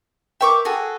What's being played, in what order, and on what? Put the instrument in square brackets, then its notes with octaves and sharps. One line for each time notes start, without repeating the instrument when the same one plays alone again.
[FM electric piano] A#4 B4 G5 [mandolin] E5 C#6 D6
[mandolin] F#4 G#4 A4